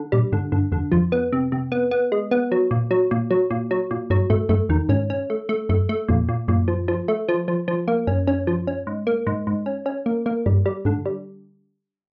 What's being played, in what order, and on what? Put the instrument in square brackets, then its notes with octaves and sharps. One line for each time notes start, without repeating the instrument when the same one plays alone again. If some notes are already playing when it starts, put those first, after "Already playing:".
Already playing: [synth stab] D3
[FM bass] A#2 [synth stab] G3
[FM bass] G#2 [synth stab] D3
[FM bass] G2 [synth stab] D3
[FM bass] F2 [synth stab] D3
[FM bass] F2 [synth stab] F3
[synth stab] B3
C3
C3
B3
B3
G#3
B3
F#3
A#2
F#3
A#2
F#3
A#2
F#3
A#2
[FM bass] G2 [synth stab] F#3
[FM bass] G#2 [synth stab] A3
[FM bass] F#2 [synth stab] A3
[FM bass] E2 [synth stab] D#3
[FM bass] G#2 [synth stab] C#4
[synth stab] C#4
A3
A3
[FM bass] F#2 [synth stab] A3
[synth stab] A3
[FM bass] F2 [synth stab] A#2
[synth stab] A#2
[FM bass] F#2 [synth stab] A#2
[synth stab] F3
F3
A3
F3
F3
F3
A#3
[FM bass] F#2 [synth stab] C#4
[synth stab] C#4
F3
C#4
G#2
A#3
G#2
G#2
C#4
C#4
A#3
A#3
[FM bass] G2 [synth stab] G3
[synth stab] G3
[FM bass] G#2 [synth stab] D3
[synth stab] G3